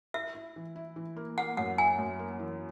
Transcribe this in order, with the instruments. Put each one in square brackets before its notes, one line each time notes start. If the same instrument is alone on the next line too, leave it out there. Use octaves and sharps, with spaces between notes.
[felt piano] E4 [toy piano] E5
[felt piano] E4
E3
E4
E3
A#3
[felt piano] A#3 [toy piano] F#5
[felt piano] F#2 [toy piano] F#5
[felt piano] E4 [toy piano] G#5
[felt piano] F#2
A#3
E3